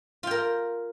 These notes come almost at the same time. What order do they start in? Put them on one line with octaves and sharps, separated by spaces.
F4 G5 A#4